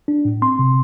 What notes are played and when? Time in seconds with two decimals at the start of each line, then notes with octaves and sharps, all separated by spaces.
0.08 D4
0.25 A2
0.42 C4 C6
0.59 C3